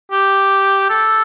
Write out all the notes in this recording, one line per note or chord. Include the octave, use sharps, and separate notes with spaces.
G4
A4